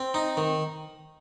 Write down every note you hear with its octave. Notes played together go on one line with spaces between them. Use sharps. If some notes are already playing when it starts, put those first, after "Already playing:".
Already playing: C4
D#4
D#3